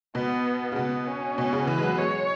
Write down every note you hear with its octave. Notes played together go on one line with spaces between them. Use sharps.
B2 B3
C#3
B2 B3
C#4
B2
C#3
E3 B4
G#3
F#3
G#3 C#5